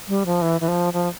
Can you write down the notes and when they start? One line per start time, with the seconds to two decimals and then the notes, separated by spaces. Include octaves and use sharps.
0.08 G3
0.26 F3
0.42 E3
0.61 E3
0.68 F3
0.93 F3